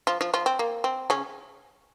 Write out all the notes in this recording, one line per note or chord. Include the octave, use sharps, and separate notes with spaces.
F3 F4
F3 F4
F3 F4
C4
A#3
C4
C#3 C#4